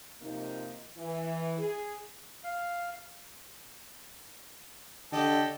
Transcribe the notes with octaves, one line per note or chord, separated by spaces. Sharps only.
C3 F3 A#3 D#4
E3
G#4
F5
D3 G4 A4 D#5